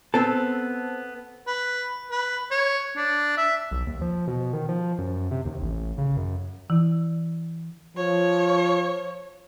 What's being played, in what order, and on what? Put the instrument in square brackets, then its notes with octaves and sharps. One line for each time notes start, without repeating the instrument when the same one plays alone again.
[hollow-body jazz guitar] B3 C4 A4
[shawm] B4
B4
C#5
D4
E5
[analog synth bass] B1
D#2
F3
B2
D#3
F3
F#2
C3
D#2
A1
C#3
F#2
[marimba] E3 E4
[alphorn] F3 [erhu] C#5